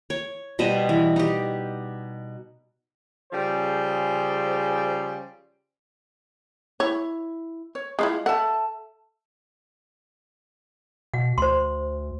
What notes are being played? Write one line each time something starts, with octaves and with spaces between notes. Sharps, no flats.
C#5
B2 G3 C5 D#5
E3
D#4 G4
C#3 F3 G3 G#4 C5
E4 C#5
C#5
G#3 C#4 E4 F4 F5
A4 E5 F#5 A5
B2 F#5
D2 C5 C6